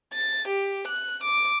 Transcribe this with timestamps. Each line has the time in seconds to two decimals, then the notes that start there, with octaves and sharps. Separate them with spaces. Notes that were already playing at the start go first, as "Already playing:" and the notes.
0.13 A6
0.48 G4
0.88 F#6
1.23 D6